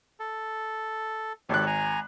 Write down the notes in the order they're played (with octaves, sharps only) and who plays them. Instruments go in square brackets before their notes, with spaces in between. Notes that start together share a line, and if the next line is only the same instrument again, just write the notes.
[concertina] A4
[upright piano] G#1 F#6 [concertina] G4 A4 C#5
[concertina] G#5 A#5